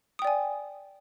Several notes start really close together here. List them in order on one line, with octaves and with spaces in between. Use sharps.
D#6 G5 D5 G#5